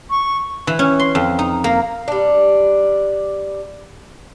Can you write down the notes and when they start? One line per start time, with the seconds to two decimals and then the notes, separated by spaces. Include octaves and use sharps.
0.10 C#6
0.67 E3
0.79 C#4
0.99 C6
1.15 F2
1.39 D#4
1.64 A#3
2.08 G3 D4